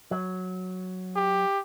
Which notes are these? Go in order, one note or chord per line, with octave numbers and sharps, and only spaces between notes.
F#3
G4